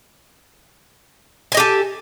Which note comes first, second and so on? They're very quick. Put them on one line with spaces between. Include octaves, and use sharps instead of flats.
G#5 D#5 G4 A4